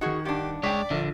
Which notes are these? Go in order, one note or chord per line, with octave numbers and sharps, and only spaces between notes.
D#3 D#4 F#4 G#4 F#5
G2 D4 G4
G#3 C#5 D5 G5 B6
A#1 D3